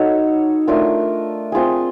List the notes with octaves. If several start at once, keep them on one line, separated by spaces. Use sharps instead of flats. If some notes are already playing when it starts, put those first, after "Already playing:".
Already playing: D#4 F#4 A4 C#5
A3 D4 F4 A#4
C4 F4 G#4